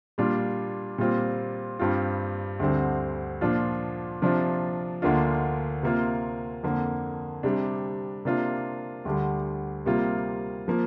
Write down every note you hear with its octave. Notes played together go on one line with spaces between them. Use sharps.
A#2 G3 D4 F4
A#2 G3 C4 F4
G2 G3 C4 F4
D2 D3 G3 C4
A#2 F3 D4 F4
C3 F3 D4 F4
D2 D3 A#3 D4 F4
C3 A#3 F4
F2 D3 A#3
C3 G3 D4
C3 A#3 D4 F4
D2 D3 G3
C3 G3 A#3 F4
F3 A#3 F4